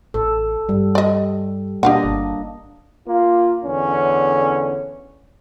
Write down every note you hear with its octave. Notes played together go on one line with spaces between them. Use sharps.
A1 A4
G2 G3
D5 D#5
B2 A#3 D4 G4 D#5 F5 F#5
G1
A#3 F4
E2 D3 C#4